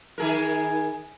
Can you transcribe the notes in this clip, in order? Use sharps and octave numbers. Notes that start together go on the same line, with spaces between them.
D#3 G#4 A#4